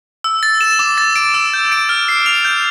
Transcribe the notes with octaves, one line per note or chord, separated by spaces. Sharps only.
E6
A6
E7
D6
A6
D7
E6
G6
D7
F6
C7
F7
G6